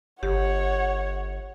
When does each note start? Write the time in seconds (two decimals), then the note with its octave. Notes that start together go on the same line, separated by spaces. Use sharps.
0.23 G1 G4 C#5 F#5